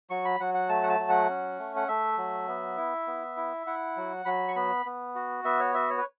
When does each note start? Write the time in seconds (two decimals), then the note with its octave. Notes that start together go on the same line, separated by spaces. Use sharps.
0.10 F#3 C#6
0.25 B5
0.40 F#3 F#5
0.54 F#5
0.69 A3 A5
0.83 F#5
0.89 A5
0.99 F#3
1.09 F#5
1.29 C#4
1.59 A3
1.76 F#5
1.88 A3 E5
2.18 F#3
2.48 B3
2.77 E4
3.07 B3
3.37 E4
3.67 E4 F#5
3.97 F#3
4.25 F#3 B5
4.48 C#6
4.56 B3 B5
4.86 B3
5.15 F#4
5.44 B3 E5
5.59 C#5
5.74 F#4 E5
5.90 C#5
5.97 B4